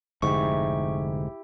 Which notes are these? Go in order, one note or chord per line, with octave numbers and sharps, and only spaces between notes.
F1 G#2 D3 E4 G4 C#6